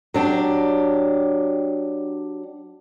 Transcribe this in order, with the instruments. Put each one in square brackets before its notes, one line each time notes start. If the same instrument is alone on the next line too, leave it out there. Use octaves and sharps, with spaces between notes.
[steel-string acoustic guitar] F#3 D4 G4